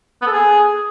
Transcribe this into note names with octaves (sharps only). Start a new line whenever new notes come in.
B3
A4
G#4